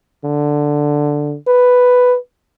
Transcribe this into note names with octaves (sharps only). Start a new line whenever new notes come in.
D3
B4